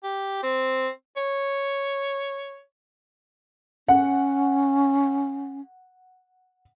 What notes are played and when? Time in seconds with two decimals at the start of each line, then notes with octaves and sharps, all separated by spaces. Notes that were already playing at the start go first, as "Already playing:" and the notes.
0.03 G4
0.43 C4
1.16 C#5
3.88 C#4 F#5